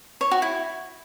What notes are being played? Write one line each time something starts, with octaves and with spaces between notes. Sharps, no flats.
C#5
F#4
E4